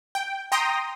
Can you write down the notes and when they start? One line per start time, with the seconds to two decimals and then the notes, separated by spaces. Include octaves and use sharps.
0.15 G5
0.52 G5 A#5 C6 D#6 A#6